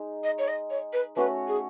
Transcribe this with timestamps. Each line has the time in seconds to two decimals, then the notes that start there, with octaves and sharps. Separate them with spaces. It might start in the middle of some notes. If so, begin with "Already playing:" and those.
Already playing: G#3 D#4
0.24 D#5
0.38 C#5
0.48 D#5
0.70 C#5
0.93 B4
1.16 A3 C#4 F#4 B4
1.47 G#4